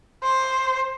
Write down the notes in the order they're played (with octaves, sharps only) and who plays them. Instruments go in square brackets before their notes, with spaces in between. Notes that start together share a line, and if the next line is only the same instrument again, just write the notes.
[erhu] C5